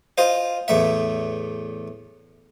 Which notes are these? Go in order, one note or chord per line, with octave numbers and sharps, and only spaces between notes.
F4 C5 D#5
E2 A2 E5